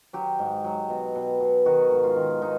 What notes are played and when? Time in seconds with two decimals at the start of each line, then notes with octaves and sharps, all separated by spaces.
0.13 F#3 G4
0.39 G#2
0.64 F#3
0.90 B2
1.16 B2
1.40 B2
1.66 D#3 F#4
1.91 G#2
2.04 F4
2.16 D#3
2.42 B2 D#4